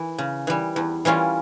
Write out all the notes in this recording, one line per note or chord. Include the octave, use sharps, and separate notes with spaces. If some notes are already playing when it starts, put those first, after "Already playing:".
Already playing: E3
C#3
E3 G3
E2
E3 G3 C#4 F4